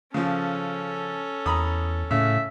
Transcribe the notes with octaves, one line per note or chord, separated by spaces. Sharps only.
C#3 F3 C#4 A4
E2 A#5 B5 D#6
A2 C#3 E5